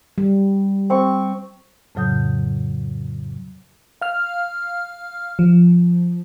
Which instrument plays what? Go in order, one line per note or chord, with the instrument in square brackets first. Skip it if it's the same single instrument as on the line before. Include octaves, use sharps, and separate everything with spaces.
[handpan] G3
[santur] C4 C#6
[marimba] F2 A2 C#3 F#3 D#6 G6
[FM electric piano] F5 F6
F3